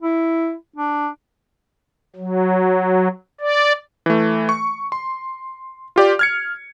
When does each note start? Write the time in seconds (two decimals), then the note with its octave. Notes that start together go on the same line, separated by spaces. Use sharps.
0.02 E4
0.76 D4
2.16 F#3
3.41 D5
4.06 E3 A3
4.49 C#6
4.92 C6
5.96 F4 G4 D5
6.19 F6 G#6 C#7